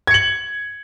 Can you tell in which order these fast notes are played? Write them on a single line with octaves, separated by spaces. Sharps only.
G#6 C#7 F#7